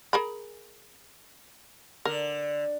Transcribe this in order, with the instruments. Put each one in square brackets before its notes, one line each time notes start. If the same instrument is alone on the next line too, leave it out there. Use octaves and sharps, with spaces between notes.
[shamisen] G#4 A#4 B5
[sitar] D3 [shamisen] A#4